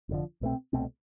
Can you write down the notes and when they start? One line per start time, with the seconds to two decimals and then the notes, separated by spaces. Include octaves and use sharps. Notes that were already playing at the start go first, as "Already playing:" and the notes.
0.09 F1 E2 D3 F3
0.41 C2 B2 A3 C4
0.73 C2 B2 A3 C4